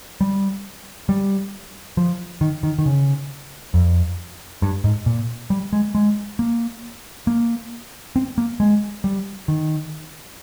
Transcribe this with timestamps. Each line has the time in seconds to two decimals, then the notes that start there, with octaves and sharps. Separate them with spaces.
0.21 G3
1.09 G3
1.97 F3
2.41 D#3
2.63 D#3
2.79 D#3
2.86 C#3
3.74 F2
4.62 G2
4.84 G#2
5.06 A#2
5.50 G3
5.73 G#3
5.95 G#3
6.39 A#3
7.27 A#3
8.16 C4
8.38 A#3
8.60 G#3
9.04 G3
9.48 D#3